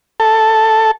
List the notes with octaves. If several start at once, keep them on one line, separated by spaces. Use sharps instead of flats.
A4